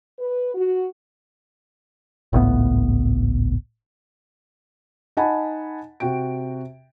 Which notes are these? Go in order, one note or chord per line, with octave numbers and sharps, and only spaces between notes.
B4
F#4
G#1 C#2 A2 B3
D#4 D#5 F#5 G#5 A5 B5
C3 F#4 G5 D7